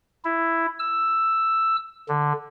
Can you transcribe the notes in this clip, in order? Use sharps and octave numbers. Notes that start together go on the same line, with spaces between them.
E4
E6
D3